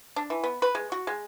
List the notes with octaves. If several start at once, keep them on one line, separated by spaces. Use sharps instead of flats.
D4
E3
B3
B4
G#3
F#4
G#3